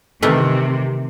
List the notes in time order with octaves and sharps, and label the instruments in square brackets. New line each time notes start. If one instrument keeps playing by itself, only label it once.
[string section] C3 [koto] D#3 E3 A3